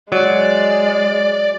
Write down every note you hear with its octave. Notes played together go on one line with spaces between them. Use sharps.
F#3 G#3 D5